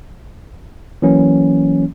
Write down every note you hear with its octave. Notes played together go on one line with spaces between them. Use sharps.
E3 F#3 A#3 C#4